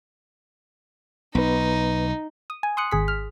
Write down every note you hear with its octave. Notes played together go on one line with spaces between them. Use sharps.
B1 B3 D#4 B4
D#6
G#5
C6 D#6 F#6 C#7
G#1 G#4 B6
F6